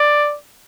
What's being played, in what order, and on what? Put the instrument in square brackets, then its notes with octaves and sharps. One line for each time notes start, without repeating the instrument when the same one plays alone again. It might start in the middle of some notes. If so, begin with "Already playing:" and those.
Already playing: [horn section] D5